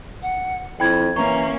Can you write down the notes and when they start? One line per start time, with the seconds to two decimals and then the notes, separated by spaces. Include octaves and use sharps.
0.22 F#5
0.80 F2 E4 G5 B5 G#6
1.16 E3 A#3 C#4 A#5 C#6